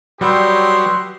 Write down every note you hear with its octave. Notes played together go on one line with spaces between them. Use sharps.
F#3 G3 G4 B4 C#5 D#5 E5 C6